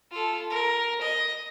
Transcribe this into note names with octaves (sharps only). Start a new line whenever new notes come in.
F4 A4
A#4
D#5